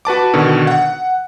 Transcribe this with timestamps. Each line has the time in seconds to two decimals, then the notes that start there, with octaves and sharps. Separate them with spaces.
0.05 F#4 B4 A5 D6
0.34 B2 D3 D#3
0.67 F#5